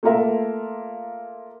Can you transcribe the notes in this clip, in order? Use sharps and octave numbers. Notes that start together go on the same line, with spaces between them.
A3 A#3 F4 A#4 E5